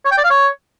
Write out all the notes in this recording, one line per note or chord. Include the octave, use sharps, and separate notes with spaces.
C#5
G5
D5
F5
C#5